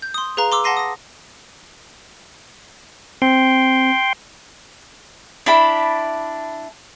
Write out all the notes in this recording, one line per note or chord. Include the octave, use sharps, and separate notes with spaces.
G6
C6 D#6
G#4 B4 F5 A#5
C6 D6 E6
F#5 A5 C6 A#6 C7 D#7
D#6 A#6
C4 G5 C6
D4 E4 A5 B5